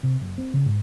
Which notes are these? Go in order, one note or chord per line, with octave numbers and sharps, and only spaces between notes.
C3
F#1
C4
C#3
G#2